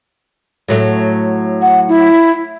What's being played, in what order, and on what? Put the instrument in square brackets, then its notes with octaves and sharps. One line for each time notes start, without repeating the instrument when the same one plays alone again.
[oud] A2 F#3 A3
[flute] F#5
E4